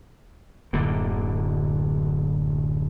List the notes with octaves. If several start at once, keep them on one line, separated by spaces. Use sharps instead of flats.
D1 F#2 D3 A#3